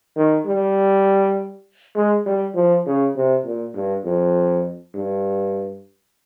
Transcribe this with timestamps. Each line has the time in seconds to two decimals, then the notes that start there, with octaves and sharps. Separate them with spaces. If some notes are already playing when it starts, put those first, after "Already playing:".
0.16 D#3
0.46 G3
1.96 G#3
2.26 G3
2.55 F3
2.86 C#3
3.16 C3
3.45 A#2
3.74 G2
4.04 F2
4.94 G2